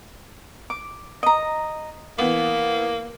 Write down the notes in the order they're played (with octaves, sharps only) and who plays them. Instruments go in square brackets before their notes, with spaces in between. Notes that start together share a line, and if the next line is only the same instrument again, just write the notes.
[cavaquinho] D6
D#5 A#5
[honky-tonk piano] E3 B3 [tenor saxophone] A#3